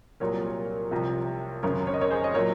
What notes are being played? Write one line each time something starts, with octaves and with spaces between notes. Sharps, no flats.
C2 A#2 F#3 A#4 C#5
C2 C3 F3
G#1 F#2 C#3 A#4 C#5
C#5
D#5
A#4 C#5
G#4 C5
D#5
A#2 F#3 A#4 C#5